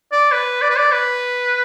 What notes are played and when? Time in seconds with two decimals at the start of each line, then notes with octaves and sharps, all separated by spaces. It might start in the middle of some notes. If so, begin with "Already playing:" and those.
0.12 D5
0.32 B4
0.62 D5
0.70 B4
0.78 D5
0.92 B4